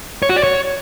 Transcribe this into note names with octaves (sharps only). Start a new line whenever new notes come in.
C#5
F#4
D5
C#5